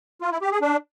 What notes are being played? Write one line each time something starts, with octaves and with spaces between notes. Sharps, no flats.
F4
E4
G4
G#4
D4